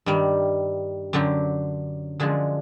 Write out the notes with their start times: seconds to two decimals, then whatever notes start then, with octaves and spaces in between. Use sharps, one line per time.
0.06 G2 D#3 G3
1.13 F#2 D3 F#3 G4
2.20 F#2 D3 F3 G#3 G#4